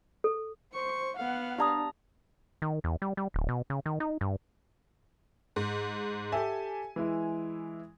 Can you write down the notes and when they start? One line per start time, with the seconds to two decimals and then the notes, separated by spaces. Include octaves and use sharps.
0.24 A4
0.73 C5 C#6
1.17 B3 F5 F#5
1.58 D4 G4 D5 A5 A#5 D#6
2.62 D#3
2.84 E2
3.02 G3
3.17 G3
3.34 D1
3.49 B2
3.70 C#3
3.86 D#3
4.00 D#4
4.21 G2
5.56 G#2
6.32 G4 A4 E5 G#5
6.96 E3 G#3 E4